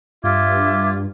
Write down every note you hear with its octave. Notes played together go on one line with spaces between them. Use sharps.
G2 F4 E5 D6 G#6